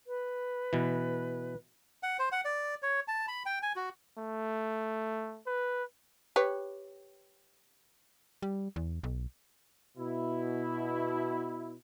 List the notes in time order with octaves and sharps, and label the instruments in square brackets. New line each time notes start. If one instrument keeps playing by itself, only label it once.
[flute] B4
[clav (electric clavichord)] B2 E3
[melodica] F#5
C5
F#5
D5
C#5
A5
B5
G5
G#5
F#4
[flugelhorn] A3
B4
[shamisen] G4 B4 C#5
[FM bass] G3
E2
B1
[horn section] B2 E4